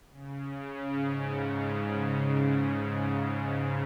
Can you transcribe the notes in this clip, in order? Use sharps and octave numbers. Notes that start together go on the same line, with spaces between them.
C#3
G#2